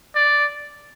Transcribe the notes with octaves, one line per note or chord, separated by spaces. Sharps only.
D5